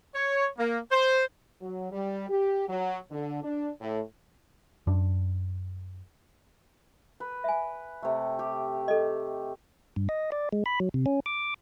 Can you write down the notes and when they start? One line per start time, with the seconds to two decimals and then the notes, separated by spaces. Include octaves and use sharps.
0.15 C#5
0.58 A#3
0.91 C5
1.61 F#3
1.91 G3
2.29 G4
2.69 F#3
3.11 D3
3.43 D4
3.81 A2
4.87 F#2 D4
7.20 B4
7.44 E5 G#5
8.02 C3 A3
8.39 G4
8.88 A4 D#5
9.96 G2
10.09 D#5
10.32 D5
10.53 G#3
10.66 B5
10.80 F#3
10.94 C3
11.06 C#4
11.26 D6